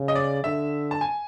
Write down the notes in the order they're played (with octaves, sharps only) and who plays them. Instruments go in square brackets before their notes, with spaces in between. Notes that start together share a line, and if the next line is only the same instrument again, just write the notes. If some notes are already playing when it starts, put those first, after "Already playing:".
Already playing: [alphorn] C#3
[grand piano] D#5
D5
[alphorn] D3 [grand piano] E5
[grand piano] A5
G#5